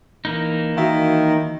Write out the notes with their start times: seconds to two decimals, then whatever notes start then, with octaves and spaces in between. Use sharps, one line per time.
0.25 E3 A#3 D#4
0.77 D#3 F#4 E5 F5